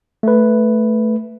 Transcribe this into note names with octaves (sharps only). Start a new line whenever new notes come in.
A3 B4